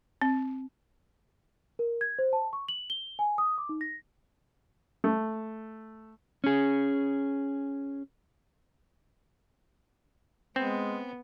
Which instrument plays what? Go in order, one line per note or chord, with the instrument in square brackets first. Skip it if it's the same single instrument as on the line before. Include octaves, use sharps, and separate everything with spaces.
[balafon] C4
[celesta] A#4
G#6
C5
A5
C#6
F#7
G7
G#5
D#6
D6
D#4
A#6
[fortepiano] A3
[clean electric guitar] C#4 G#4
[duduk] G#3 [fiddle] B3 [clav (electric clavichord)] C4